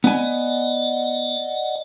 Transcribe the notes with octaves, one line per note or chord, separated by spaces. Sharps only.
B3 D5 D#5 F#5 G#5